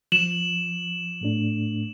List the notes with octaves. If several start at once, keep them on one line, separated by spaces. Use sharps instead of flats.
F3 E7 F#7
A2 A3 D4